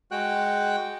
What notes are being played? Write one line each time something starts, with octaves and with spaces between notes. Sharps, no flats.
G#3 F#4 G5 F#6